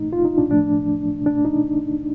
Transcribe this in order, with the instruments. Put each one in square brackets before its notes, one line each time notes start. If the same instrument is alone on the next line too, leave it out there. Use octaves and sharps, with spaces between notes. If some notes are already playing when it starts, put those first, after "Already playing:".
Already playing: [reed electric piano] A#2 A3 D#4
F4
D#4
D4
A2 F3 A3 D4
A#2 A3 D4
D#4